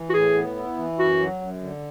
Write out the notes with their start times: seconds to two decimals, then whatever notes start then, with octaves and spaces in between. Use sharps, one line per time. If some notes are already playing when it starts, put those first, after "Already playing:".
Already playing: E3
0.10 F#4
0.14 A2 G#4
0.35 B3
0.56 E4
0.77 E3
0.98 F#2 F#4
1.20 F#3
1.42 F#2
1.62 D3